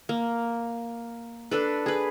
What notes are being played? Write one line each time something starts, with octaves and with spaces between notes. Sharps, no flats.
A#3
D4 A4 B4
G#4 B4